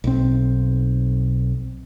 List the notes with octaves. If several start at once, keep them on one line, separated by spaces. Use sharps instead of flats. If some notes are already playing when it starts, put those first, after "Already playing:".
B1 C4